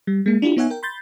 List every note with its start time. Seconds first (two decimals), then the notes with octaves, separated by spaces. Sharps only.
0.07 G3
0.26 G#3 A#3
0.42 D4 E4 F4 G4
0.56 B3 D#4 C#5 E5 F#5 G#5
0.70 A#4 G5
0.83 B5 C6 G6 A6